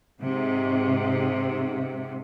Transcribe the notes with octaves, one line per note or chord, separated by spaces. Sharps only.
G#2 C3